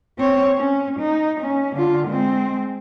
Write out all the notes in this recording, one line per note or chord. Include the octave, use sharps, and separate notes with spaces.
C4 C#5
C#4
D#4
C#4
D3 F4
G#3 C4